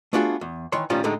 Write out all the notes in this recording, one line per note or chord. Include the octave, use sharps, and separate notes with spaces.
A3 B3 D4 F4 F#4 G#4
E2
D#3 E3 C#5 C6
A2 D#3 F3 G3 C#4 F4
A2 D3 G#3 A3 D#4 G4